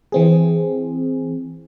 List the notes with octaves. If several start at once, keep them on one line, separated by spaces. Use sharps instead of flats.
E3 C4 G#4